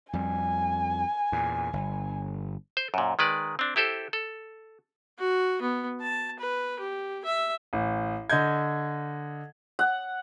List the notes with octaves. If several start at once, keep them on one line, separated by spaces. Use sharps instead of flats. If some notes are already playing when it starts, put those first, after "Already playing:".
F2 G3 G#5
E2 A#2
G1
C5
F#2 A#2
D#3 G#3 B4 D5
C4 D4
E4 G4 A4 C5
A4
F#4
B3
A5
B4
G4
E5
A1
D3 D#5 G6 G#6
F#5